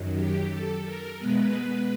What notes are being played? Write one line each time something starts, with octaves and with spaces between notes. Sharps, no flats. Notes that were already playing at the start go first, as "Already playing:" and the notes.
Already playing: F#2 D#3 F#3
G4
A4
A#4
B2 G#3 B3 B4